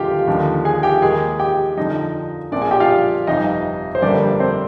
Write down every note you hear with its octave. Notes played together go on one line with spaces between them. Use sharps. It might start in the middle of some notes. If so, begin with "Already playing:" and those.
Already playing: D#2 D3 G#3 F4 G4 F5 G5
D#2 D3 F3
G#4 G#5
G4 G5
D#2 D#3 G#3 G#4 G#5
G4 G5
F2 D3 F3 D#4 D#5
A#1 A#2 F3 C4 D4 D5
G#4 G#5
G4 G5
F4 F5
G1 F2 C3 D#4 D#5
C5
G1 F2 D3 G3 A#3 D4 D5
C4 C5